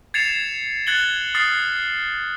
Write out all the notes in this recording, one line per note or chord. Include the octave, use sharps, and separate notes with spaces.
G#6 A6 C7 C#7 E7 F7
F#6 G#6 A6 C#7 F#7 G7
D#6 F6 A6 C7